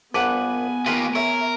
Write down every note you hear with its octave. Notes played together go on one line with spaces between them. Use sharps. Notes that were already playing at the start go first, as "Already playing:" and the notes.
A#1 G2 B3 B4 F#5 G#5 D6
A#3 F4 G4 A#4 B4
A#4 C#5 E5